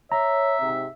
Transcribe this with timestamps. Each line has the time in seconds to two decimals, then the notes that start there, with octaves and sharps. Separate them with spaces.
0.12 C#5 E5 A#5
0.60 G#2 C3